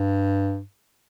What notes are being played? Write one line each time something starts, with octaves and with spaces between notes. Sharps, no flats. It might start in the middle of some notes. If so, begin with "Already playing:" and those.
Already playing: G2